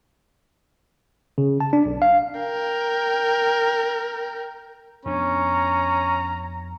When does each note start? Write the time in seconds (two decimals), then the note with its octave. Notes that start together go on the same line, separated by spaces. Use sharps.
1.38 C#3
1.60 A5
1.73 D4
1.86 B1
2.02 F5
2.39 A#4 G5
5.06 F2 B3 C#4 D4 A#5